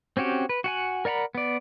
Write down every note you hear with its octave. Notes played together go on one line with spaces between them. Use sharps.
C4 C#4 F#4 G4
B4
F#4 F#5 G#5
A#4 D5 F#5 A#5 B5
B3 D5